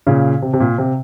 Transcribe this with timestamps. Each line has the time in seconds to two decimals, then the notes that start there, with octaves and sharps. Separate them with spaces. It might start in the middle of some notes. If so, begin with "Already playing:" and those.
0.07 A#2 C#3
0.42 C3
0.53 C3
0.60 A#2
0.78 C3